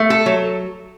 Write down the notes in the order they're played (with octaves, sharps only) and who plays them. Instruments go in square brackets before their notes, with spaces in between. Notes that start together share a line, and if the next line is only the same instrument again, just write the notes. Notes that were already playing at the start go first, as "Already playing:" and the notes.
Already playing: [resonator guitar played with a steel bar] A3
A4
F#3